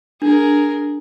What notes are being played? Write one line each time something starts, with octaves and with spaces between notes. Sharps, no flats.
D4 G#4 A#4